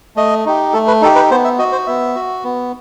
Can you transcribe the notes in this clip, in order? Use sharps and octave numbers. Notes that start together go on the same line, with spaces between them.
A3 D#5
D#4 G4
A3 A4
B4
D#4 G4 A4
B4
B3 C5
E5
F#4 D#5
C5
B3 E5
F#4
B3